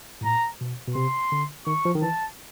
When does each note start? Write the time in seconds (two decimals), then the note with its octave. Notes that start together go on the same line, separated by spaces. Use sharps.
0.21 A2
0.24 A#2 A#5
0.61 B2
0.88 B2
0.95 C3 C6
1.32 D3
1.66 D#3 C#6
1.85 F3
1.95 D#3
2.02 E3 A5